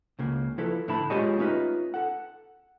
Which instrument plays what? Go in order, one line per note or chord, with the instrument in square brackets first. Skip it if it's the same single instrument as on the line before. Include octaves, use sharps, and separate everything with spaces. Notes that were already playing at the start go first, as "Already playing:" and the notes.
[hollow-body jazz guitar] C#2 C#3 A#3
F3 E4 A4 B4
A2 D3 A3 E4 A5 B5
G#3 F4 G4 G#4 C#5 D#5
A3 C#4 D#4 F4 B4
A4 F#5